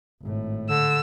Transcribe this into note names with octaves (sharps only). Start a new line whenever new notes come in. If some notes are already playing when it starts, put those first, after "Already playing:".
G#1 A2
D3 E6